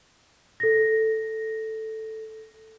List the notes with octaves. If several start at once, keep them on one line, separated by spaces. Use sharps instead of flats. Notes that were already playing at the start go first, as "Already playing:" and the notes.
A4 A#6